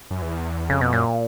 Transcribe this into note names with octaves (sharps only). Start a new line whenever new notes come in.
F#2
E2
F2 C#3
B2
F#2 A#2